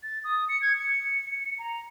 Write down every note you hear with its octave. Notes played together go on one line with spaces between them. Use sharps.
A6
D#6
C#7
G#6
C#7
A#5